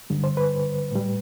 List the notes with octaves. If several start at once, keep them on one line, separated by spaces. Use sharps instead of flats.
G2 D3 G3
C5
B4
A2 G3